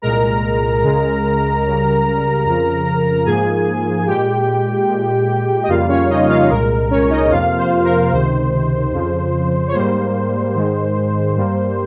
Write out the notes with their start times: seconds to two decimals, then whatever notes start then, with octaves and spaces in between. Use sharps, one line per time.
0.02 C2 A#2 G#3 A#4 A#5
0.83 C#2 C#3 G#3
1.64 C#2 C#3 G3
2.45 F2 C#3 F3
3.25 G#2 F3 A#3 G#4 G#5
4.07 A#2 G#3 G4 G5
4.88 A#2 G#3
5.63 D#5
5.68 F2 C#3 G3 A#3 F4 F5
5.89 C#4 C#5
6.09 D#4 D#5
6.29 F4 F5
6.50 C2 A#2 G#3 A#4
6.90 C#4 C#5
7.10 D#4 D#5
7.31 F2 C3 F3 A#3 F4 F5
7.58 C5
7.84 A#4
8.11 C#2 C3 D#3 C5
8.92 F2 C#3 F3
9.68 C#5
9.74 G#2 G3 A#3 C5
10.54 G#2 D#3 G#3
11.35 G2 G3 A#3